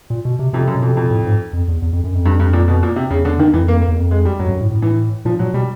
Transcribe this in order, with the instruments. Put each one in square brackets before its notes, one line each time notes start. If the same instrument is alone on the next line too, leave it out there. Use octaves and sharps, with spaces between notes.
[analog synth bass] A#2
B2
C3
[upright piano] F2 [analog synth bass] C3
[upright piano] F#2
[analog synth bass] B2
[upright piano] F2
[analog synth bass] C3
[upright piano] F2 [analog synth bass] B2
[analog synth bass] A2
G#2
F2
E2
E2
F2
F#2
F2
[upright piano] G2
G2
A#2
B2
A#2
C3
[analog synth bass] E2 [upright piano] C#3
[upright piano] D3
D#3
[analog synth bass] F2 [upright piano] E3
[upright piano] A#3
A#3
[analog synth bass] E2
F2
[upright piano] G#3
G3
[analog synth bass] F#2 [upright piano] F#3
[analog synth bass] F2
F#2
A2
A2
[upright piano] E3
[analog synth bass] A#2 [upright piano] F3
[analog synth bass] A#2 [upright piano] F#3
[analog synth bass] B2 [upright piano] G3